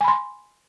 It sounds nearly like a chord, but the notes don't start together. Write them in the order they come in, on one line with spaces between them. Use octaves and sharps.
G#5 B5 C6